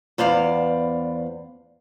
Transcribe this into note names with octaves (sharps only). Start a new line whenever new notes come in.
E2 B3 C5 D5 F5